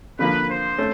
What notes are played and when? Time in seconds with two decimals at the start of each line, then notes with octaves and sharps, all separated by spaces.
0.19 D3 F3 A#3 B4
0.49 C5
0.78 A3 C#4